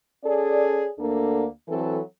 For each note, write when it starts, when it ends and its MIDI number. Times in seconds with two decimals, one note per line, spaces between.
0.24 0.87 61
0.24 0.87 68
0.24 0.87 69
0.24 0.87 74
0.99 1.44 38
0.99 1.44 50
0.99 1.44 58
0.99 1.44 62
0.99 1.44 69
1.68 1.98 52
1.68 1.98 54
1.68 1.98 60
1.68 1.98 69